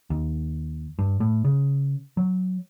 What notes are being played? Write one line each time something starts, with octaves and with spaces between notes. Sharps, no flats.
D#2
G2
A2
C#3
F#3